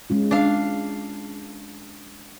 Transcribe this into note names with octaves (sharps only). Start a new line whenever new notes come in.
G#3 C#4 F4
D4 F5